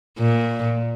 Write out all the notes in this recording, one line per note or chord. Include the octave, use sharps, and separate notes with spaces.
A#2